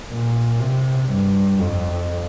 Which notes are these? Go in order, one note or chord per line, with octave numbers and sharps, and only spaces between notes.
A#2
C3
G2
F2